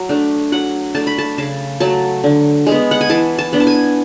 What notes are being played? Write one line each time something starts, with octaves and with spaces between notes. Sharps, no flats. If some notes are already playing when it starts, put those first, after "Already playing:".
Already playing: F#3
A3 D4
F#3 F#5
A3 D4 A5
B5
A5
C#3 A5
F#3 A3 A5
D3
G#3 B3
F#5
G#5
E3 A5
A5
B3 D4
A5
G#5